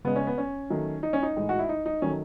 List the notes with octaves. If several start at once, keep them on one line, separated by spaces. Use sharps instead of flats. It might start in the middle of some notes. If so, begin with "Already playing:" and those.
C#3 G#3 B3
C#4
B3
C#4
D#3 F#3 A3
D#4
C#4
D#4
A2 E3 G#3
F#4
E4
D#4
D#4
D#3 F#3 A3 C#4